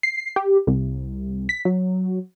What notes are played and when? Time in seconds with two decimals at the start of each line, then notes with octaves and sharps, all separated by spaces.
0.03 C7
0.36 G4
0.67 C2
1.49 B6
1.65 F#3